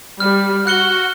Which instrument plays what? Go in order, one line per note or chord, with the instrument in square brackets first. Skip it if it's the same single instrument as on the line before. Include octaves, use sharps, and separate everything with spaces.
[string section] G3 [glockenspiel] F6
[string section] F#4 [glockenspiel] F#6 C#7 G7